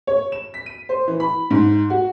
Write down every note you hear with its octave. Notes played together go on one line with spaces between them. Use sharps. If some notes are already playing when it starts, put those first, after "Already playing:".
C#5
E7
B6
D#7
C5
E3
B5
G#2
F#4